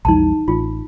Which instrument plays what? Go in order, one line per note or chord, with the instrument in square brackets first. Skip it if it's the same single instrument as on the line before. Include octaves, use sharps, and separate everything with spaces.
[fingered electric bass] A#1 E2 G3 [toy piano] D#4 A5
[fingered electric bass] A1 [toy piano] F4